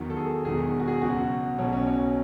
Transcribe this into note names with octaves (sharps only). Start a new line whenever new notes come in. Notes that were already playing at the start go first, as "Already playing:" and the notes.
Already playing: E2 D#3 F#3
A4
G#4
E1 E2 D#3 F#3 G#4
F#4
G#4
C#2 B2 F#3 F#4
B1 B2 F#3 C#4
C#4
C#4